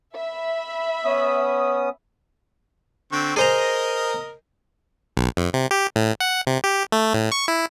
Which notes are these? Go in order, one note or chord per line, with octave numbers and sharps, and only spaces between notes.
E5 B5
B3 C#4 D#6
D3 C4 C#6
G#4 A#4 C5 D#5 A#5
B1
F2
C3
G4
A2
F#5
C3
G4
A3
A2
C#6
E4